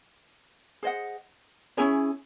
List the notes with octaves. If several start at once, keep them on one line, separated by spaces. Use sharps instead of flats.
G#4 C5 D#5 F#5
C#4 E4 G#4 C#5